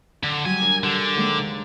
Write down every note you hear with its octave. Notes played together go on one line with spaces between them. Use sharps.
D3 D4
F#3 G3 G#5
D4 A#4
D3 G4
D#2 G#3 A#3